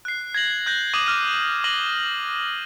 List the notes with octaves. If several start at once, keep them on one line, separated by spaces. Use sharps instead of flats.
F#6 C7
G#6 A#6 F#7
F#6 G6 A#6
D6 D#6 G#6 D#7 E7 F#7
D6 F6 D#7
D6 A#6 D#7 F#7 G7